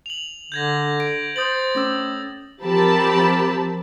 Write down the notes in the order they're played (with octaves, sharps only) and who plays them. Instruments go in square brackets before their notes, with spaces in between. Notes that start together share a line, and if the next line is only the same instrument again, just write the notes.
[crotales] F7 F#7
[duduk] D3 [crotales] G6 G#6 A#6
[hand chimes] D7
[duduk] C5 [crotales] D#6 A6 F#7
[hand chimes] A3 C#4 E6
[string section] F3 C4 G4 A#4 A5 B5